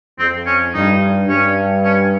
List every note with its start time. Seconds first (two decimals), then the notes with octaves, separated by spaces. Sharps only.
0.19 F2 C4
0.46 C#4
0.74 G2 D#4
1.29 G2 C#4
1.84 C#4